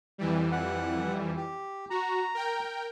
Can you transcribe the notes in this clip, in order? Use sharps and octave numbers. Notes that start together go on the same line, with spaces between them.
F2 E3 G3
F#5
G4
F#4 A#5
A#4 G5